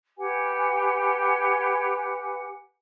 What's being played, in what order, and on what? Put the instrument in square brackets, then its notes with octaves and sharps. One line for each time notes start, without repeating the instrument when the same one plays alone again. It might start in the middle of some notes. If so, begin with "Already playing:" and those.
[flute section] G4 B4 F#5 G#5